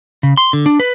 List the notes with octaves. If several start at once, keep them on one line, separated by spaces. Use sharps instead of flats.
C#3
C6
D3
D4
B4